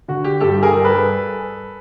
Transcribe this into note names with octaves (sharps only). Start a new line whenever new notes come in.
D3 F#4
G4
G2 G4 A4
G#4 A#4
G2
A4 B4